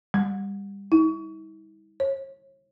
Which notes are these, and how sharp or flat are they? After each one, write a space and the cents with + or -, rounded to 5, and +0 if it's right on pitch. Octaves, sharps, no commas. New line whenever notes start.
G3 +25
E4 -45
C#5 -35